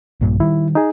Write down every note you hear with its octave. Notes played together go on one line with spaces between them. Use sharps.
A#1 G2 A#2
D#3 G3 E4
D#4 G#4